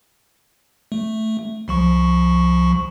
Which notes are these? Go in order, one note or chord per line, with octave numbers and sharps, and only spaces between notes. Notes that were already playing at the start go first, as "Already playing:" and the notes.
A3
C2 F3 C#6